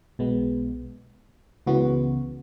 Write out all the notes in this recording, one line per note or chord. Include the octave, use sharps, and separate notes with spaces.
B1 B2 G#3 B3
C#2 C#3 E3 B3 F#4